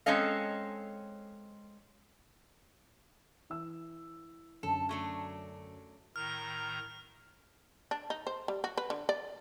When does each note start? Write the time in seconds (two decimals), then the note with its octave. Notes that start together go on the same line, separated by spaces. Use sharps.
0.06 G#3 C4 C#4 A4 D#5 F5
3.50 E3 E5 E6
4.63 F#2 D3 A4
4.89 F#3 A3 D4
6.16 A2 D#3 A#5 F6
7.91 D4
8.10 D#4
8.27 C5
8.48 G3
8.64 F#4
8.78 B4
8.90 D3
9.09 D5